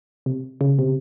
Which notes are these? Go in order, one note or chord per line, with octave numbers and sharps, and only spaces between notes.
C3
C#3
C3